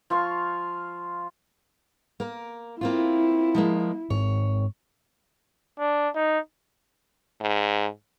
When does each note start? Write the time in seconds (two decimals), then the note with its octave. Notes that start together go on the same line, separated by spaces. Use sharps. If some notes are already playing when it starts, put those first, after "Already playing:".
0.10 F3 F4 F5 C#6
2.20 A#3 A#4
2.81 A#3 C4 E4 F4
3.55 F3 G#3 A#3
4.10 G#2 C4 C#5
5.79 D4
6.15 D#4
7.41 G#2